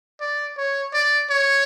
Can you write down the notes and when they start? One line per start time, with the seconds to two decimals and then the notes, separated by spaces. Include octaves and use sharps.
0.20 D5
0.57 C#5
0.93 D5
1.30 C#5